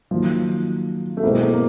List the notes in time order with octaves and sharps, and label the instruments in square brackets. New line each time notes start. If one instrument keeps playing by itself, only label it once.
[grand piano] D#3 F#3 A#3 [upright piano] F3
[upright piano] A3
[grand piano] B2 G#3 C4 E4 [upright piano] A#3
[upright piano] A#3
A#3